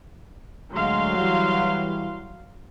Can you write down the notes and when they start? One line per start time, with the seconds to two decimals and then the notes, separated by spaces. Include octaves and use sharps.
0.74 D2 F#3 G#3 F5 C6
1.18 E3 G3